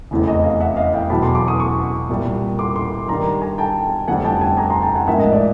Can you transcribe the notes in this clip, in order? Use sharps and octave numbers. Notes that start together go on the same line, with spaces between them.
F1 E2 C#3 E3
D#5
D#5 F5
E5 F#5
D#5 F5
F5 G5
E2 B2 F#3 A5 B5
C6 D6
C6 D6
C#6 D#6
C#6 D#6
C2 A#2 G3
C6 D6
C6 D6
G2 D#3 G3 A#5 C6
G#5 A#5
G5 A5
F1 F2 D3 G3 F#5 G#5
G5 A5
F#5 G#5
G#5 A#5
A#5 C6
G5 A5
F#5 G#5
A1 G#2 F3 A#3 E5 F#5
D#5
D5 E5